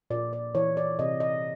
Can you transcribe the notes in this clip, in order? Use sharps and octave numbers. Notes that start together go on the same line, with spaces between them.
A#2 D5
D5
E3 C#5
D5
C3 D#5
D#5